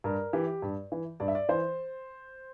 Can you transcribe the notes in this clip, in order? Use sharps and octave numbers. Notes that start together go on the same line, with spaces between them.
G2 A#4
E3 G4
G2
E3
G2 D5
E5
D5
E3 C5